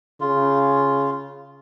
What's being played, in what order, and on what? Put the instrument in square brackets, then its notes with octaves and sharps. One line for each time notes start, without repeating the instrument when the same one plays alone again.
[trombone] C#3 [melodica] F4